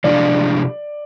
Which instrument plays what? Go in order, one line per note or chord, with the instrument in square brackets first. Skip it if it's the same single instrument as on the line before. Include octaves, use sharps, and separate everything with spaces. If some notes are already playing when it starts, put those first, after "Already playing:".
[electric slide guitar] C3 F3 G#3 D4 F4 [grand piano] D5